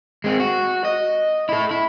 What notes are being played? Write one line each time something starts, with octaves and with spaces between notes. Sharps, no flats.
G#3 C4
F#4
D#5
E4 A4
E4